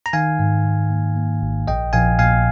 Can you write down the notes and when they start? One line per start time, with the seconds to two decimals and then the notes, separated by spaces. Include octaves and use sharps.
0.06 A#5
0.13 D#3 F5 G#5
0.39 G#2
0.65 D#3
0.90 A#3
1.16 A#3
1.42 G#1
1.68 A#1 D#5 G5
1.93 A#1 F5 G#5
2.19 A#2 F5 G#5